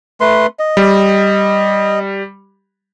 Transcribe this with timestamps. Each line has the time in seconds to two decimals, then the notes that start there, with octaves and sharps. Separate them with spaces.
0.21 A3 B4 C6
0.59 D#5
0.77 G3